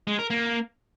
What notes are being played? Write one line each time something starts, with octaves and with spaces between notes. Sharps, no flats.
G#3
A#4
A#3